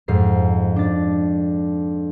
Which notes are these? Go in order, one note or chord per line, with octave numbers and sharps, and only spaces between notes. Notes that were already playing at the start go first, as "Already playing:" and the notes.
F2 G#2 C7
D4 A6